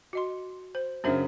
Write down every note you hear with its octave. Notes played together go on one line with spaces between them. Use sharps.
F#4 D#5 C6
C5
F#2 C#3 D4 C5 E5